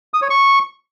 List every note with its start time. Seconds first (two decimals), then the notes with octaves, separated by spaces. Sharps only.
0.14 D#6
0.22 C#5
0.30 C#6